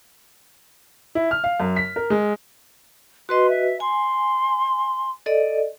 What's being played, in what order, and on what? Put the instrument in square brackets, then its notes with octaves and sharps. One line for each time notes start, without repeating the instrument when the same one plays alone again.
[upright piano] E4
F6
F5
F#2
B6
A#4
G#3
[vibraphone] F#4 B4 D#5 [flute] C6
[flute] E5
[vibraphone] G#5 [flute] C6
[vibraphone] A4 D5 D#5